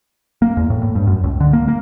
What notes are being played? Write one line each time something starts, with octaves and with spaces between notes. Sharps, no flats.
A#3
E2
A2
A2
G2
F#2
C#2
D3
A#3
A#3